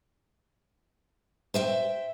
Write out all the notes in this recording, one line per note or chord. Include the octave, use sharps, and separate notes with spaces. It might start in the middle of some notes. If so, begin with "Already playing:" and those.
C5 E5 G5